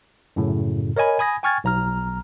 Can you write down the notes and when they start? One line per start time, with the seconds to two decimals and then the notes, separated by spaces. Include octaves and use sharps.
0.36 F#2 A2 C#3
0.96 A#4 C#5 D#5 G#5 B5
1.19 G#5 B5 D#6 G#6 A#6
1.43 G5 G#5 C#6 F6 G#6 A6
1.64 B1 A#5 F6